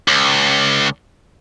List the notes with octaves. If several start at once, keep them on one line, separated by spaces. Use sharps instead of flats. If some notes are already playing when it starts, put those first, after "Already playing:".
C#2